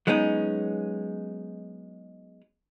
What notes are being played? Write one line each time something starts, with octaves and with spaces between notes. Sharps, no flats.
F#3 G#3 B3 C#4 D#4